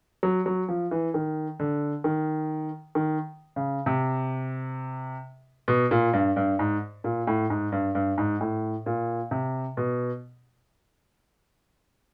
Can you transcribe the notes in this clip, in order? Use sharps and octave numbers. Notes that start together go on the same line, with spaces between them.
F#3
F#3
F3
E3
D#3
D3
D#3
D#3
C#3
C3
B2
A#2
G2
G2
G#2
A#2
A2
G#2
G2
G2
G#2
A2
A#2
C3
B2